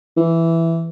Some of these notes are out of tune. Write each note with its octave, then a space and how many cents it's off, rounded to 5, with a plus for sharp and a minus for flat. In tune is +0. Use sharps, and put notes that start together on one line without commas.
E3 +5